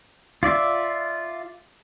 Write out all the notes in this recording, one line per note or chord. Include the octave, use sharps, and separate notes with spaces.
F4 D5 E5